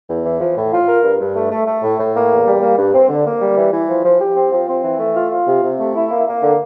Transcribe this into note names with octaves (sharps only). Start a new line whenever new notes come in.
E2
E3
F3
A2
F4
A#4
G2
G2
A3
A3
A3
A2
A2
A#3
E2
G3
A#3
G2
C4
D3
A#3
G3
E3
E3
F3
F3
G4
C4
F3
C4
E3
A3
F4
F4
C3
C3
A3
E4
A#3
A#3
D3